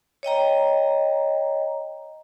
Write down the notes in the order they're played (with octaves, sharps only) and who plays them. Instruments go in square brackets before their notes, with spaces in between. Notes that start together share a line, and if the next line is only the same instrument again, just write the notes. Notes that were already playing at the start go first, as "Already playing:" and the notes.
[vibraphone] C#5 D#5 G5 A#5